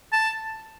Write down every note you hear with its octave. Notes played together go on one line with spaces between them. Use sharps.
A5